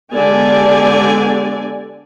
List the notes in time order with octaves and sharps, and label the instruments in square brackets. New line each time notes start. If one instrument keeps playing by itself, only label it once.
[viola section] D3 G#3 B3 G4 D5 G#5